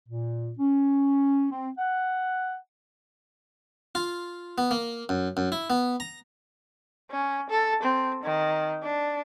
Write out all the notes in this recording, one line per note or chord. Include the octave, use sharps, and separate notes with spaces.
A#2
C#4
C4
F#5
F4
B3
A#3
F#2
F#2
E4
B3
A#5
C#4
A4
C4
D#3
D4